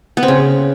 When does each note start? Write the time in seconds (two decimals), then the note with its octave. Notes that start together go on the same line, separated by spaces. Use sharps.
0.17 B3
0.23 C4
0.28 C#3